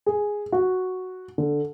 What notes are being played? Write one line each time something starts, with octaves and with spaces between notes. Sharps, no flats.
G#4
F#4
D3